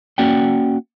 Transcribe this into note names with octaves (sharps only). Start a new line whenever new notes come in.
A#3 C#4 F#4 D5 F#5 G5